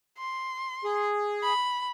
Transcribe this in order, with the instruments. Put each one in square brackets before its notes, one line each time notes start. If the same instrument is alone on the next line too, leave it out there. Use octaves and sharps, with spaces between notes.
[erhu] C6
[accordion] G#4
[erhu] B5